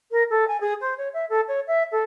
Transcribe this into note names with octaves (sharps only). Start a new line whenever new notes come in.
A#4
A4
G#5
G#4
C5
C#5
E5
A4
C#5
E5
A4